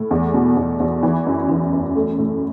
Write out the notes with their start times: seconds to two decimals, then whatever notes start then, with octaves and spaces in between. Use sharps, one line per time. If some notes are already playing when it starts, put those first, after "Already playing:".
Already playing: A2
0.11 E2
0.34 B2
0.57 E2
0.80 E2
1.03 E3
1.26 F#2
1.49 E3
1.73 F#2
1.95 A3
2.18 A2